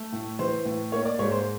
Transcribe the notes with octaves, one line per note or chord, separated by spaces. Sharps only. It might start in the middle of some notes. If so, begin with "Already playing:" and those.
Already playing: A3
A2
E3 C5
A2
A#3 C#5
D5
G#2 C#5
C5